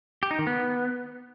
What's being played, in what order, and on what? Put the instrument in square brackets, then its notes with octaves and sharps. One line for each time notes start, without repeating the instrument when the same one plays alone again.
[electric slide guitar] G4
D#4
D#3
B3